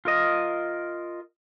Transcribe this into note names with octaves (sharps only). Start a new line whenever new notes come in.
F4 A#4 D#5